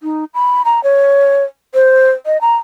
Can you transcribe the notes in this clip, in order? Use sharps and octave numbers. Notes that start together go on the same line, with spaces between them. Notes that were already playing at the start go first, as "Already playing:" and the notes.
D#4
B5
A#5
C#5
C5
D#5
A#5